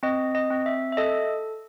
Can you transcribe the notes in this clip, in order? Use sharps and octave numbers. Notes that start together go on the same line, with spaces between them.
C4 D#5
D#5
C4
E5
E5
A4 D#5